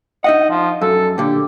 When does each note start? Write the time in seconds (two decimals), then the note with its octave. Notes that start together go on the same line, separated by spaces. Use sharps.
0.24 D#4 D#5 E5 F#5
0.50 F3
0.81 F#2 A4
1.18 A#2 D3 G4